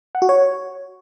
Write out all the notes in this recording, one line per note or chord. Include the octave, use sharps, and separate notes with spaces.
F#5
F#4
C#5